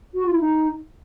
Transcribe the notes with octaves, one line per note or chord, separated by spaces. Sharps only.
F#4
F4
E4
D#4